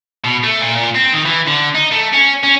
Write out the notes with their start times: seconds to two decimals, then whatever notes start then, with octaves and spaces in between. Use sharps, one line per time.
0.24 B2
0.44 A3
0.61 A#2
0.75 A#2
0.95 C4
1.13 D#3
1.25 E3
1.47 D3
1.75 D#4
1.92 A3
2.14 C#4
2.44 C#4